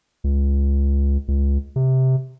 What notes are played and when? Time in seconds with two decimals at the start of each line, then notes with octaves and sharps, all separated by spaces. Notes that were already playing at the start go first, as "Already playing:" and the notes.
0.24 C#2
1.28 C#2
1.76 C3